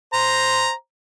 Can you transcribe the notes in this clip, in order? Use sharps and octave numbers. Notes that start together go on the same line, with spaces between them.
C5 A#5